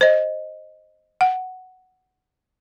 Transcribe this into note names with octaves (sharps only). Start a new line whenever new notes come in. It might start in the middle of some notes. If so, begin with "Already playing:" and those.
C5 D#5
F#5